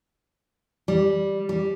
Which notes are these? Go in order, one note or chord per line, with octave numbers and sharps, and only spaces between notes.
G3
G3